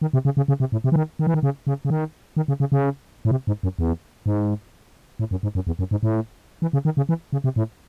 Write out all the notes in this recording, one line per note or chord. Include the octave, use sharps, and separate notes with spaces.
D#3
C3
C#3
C#3
C#3
C3
A2
C3
E3
D#3
D#3
E3
D#3
C#3
C#3
C#3
D#3
D#3
C#3
C#3
C#3
A2
C3
G#2
F#2
E2
G#2
A2
F#2
G#2
F#2
E2
F#2
G#2
A2
E3
C#3
D#3
C#3
E3
C#3
C3
A2